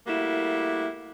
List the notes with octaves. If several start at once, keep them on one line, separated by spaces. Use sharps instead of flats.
G3 A3 A#3 E4 F#4